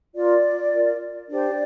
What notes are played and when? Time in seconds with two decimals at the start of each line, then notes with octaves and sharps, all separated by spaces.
0.15 F4 A#4 D5
0.72 F4 A#4
1.29 D4 G4 C5 D5